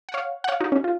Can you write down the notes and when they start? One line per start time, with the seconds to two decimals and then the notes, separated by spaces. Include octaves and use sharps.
0.09 F#5
0.14 C#5 F5
0.44 F#5
0.49 C#5 F5
0.61 D#4 F#4
0.72 C#4
0.84 F4